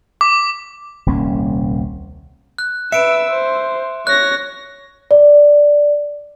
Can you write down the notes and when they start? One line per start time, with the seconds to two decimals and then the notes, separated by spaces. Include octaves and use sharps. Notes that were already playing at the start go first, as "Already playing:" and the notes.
0.21 D6
1.06 D#1 C2 A#3 C#4
2.59 F#6
2.92 B4 E5 E6 C#7 D7
3.30 C5
4.07 C#5 F#6 A#6
5.11 D5